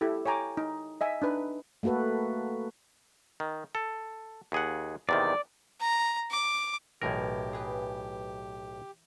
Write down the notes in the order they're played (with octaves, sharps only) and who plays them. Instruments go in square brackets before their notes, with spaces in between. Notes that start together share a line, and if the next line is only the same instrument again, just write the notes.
[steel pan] E4 G4 A4
C#5 G5 G#5 A#5 D6
D#4
D#5 E5 G#5
D4 D#4 B4
[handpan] A3 A#3 F#4 A4 B4
[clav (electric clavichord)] D#3
A4
D#2 G#4 F#5
[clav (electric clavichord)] E2 C3 D#3 [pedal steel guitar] D5
[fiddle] A#5
D6
[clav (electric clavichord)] B1 A2 A#4 [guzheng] E3 [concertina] G4
[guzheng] G#4 B4